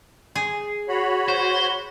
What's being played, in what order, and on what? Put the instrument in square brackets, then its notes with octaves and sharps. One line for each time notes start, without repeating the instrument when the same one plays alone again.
[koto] G#4
[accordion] F#4 C#5 B5
[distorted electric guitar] C5